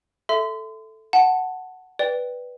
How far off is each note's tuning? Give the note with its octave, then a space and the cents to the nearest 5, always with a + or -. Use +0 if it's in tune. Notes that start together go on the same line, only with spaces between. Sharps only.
A4 +0 E5 +0 C6 -35
F#5 +0 A5 +5
B4 +0 D5 +10 G5 +0